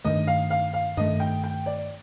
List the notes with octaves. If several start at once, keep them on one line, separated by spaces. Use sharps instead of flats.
G2 D#3 A3 D#5
F5
F5
F5
G2 D#3 A3 D#5
G5
G5
D5